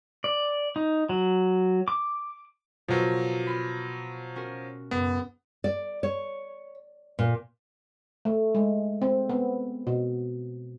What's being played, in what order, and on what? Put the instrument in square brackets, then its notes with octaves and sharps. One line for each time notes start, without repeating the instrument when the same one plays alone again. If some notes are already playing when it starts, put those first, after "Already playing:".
[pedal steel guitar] D5
D#4
F#3
D6
[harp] B2 A#4 [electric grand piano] F3 F#3
[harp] F4 B5
C#4 F#4 A#4
[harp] F#1 [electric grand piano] B3
[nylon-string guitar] D5
C#5
A#2
[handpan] A3
G#3
C4
B3
B2